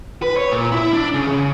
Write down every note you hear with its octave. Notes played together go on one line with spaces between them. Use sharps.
B4
C#5
A#2
E4
D4
C#3
C#3